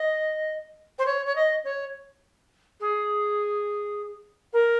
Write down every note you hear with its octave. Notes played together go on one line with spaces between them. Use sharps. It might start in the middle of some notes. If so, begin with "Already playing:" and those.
Already playing: D#5
C5
C#5
C#5
D#5
C#5
G#4
A#4